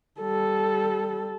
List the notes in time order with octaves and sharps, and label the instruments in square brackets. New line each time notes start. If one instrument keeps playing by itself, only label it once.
[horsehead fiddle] G3 A4